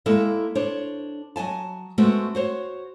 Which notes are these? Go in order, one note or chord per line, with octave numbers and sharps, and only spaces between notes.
G#3 A#3 E4 A4 D#5 E5
D4 C5 C#5
F#3 D#5 G#5 A5
G#3 A3 B3 C4 F#4
F#4 C5 C#5